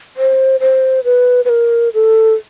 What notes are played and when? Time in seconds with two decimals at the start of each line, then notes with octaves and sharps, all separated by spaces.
0.17 C5
0.60 C5
1.04 B4
1.45 B4
1.49 A#4
1.94 A4